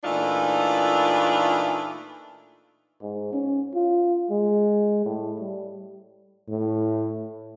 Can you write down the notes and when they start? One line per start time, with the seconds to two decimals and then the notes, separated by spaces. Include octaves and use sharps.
0.04 A#2 E3 A3 D4 D#4 F4
3.02 G#2
3.33 C#4
3.74 F4
4.30 G#3
5.06 A2
5.40 G3
6.48 A2